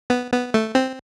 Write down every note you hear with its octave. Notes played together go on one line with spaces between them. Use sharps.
B3
B3
A3
C4